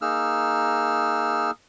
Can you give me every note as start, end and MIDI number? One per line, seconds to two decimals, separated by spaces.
0.02 1.51 58
0.02 1.51 63
0.02 1.51 68
0.02 1.51 88
0.02 1.51 89